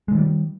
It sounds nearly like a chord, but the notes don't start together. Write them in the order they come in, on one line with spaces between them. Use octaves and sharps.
G#3 D3 D#3 G3